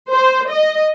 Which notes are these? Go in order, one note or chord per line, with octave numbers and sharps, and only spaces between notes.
C5
D#5